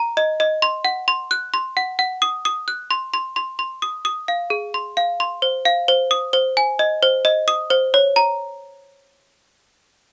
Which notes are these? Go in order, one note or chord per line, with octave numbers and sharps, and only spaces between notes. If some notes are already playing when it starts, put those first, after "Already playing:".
Already playing: A#5
D#5
D#5
C6
F#5
C6
F#6
C6
F#5
F#5
D#6
D#6
F#6
C6
C6
C6
C6
D#6
D#6
F5
G#4
C6
F5
C6
C5
F5
C5
D#6
C5
G#5
D#5
C5
D#5
D#6
C5
C#5
A#5